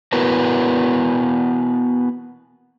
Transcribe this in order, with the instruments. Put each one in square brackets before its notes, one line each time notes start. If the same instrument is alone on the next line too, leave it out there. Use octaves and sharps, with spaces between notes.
[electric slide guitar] B3 E4 F#4 A#4 B4